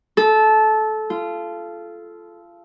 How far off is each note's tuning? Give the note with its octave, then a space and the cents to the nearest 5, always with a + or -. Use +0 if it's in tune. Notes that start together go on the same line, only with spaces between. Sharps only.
A4 -20
F4 -25